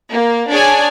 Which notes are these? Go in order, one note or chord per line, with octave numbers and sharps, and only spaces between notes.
A#3
D4 G#4 C#5 D5 G#5 A5